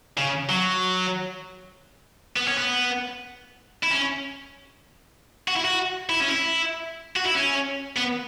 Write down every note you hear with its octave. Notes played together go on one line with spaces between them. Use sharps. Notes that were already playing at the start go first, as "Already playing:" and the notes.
C#3
F#3
B3
C#4
B3
E4
C#4
F#4
E4
F#4
E4
C#4
E4
F#4
E4
C#4
B3